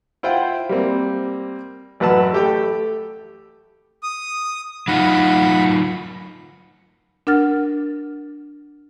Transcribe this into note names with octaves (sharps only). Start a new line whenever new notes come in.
E4 F4 C5 F#5 G5
G3 A#3 C4
A1 F#2 B4 F#5 A5 E6
A3 G4 A4 G5
D#6
F#3 D#4 F4 F#5 B5
D4 A#4 F#5 F6 A6